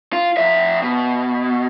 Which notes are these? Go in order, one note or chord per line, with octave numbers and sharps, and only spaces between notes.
F4
F2 E5
B2